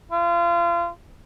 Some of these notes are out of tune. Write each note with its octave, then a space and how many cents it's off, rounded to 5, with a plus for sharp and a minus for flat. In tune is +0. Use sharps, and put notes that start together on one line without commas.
F4 -30